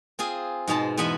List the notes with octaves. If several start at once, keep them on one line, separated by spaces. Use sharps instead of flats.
C4 F4 G#4 G#5
G#2 B2 G#3 A5
E2 G#3 B3 B4 E5 G#5